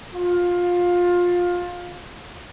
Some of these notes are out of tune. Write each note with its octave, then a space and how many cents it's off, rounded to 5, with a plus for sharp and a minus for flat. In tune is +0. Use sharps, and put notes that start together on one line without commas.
F4 +20